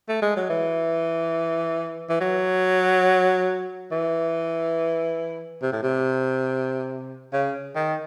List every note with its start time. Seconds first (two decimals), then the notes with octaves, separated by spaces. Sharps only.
0.09 A3
0.22 G#3
0.36 F#3
0.50 E3
2.09 E3
2.21 F#3
3.91 E3
5.62 C3
5.72 A2
5.83 C3
7.33 C#3
7.76 D#3